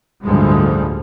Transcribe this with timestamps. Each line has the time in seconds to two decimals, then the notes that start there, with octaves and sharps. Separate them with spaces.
0.24 A1 D2 G2 F3 G3 G#3